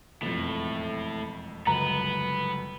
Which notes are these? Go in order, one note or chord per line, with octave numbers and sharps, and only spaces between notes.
E1 F2 A2
G1 C#2 F#2 B3 A#5